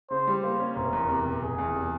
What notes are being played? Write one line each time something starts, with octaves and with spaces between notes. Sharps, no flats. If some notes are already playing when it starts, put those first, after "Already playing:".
C#3 C5
G3
A#3 C5
C#4
F1 A#4
E2
C3
F1
F1 G#4
E2
C3